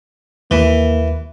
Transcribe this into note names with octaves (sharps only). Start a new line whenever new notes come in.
D#2 E3 A#3